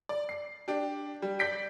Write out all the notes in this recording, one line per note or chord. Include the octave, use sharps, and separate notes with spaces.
D5
C7
D4 G4
G3
D5 G6 B6 D7